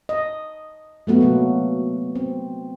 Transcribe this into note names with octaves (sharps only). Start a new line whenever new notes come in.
D#5
F#3 A3 B3 F#4
C3 F#3 A#3
C4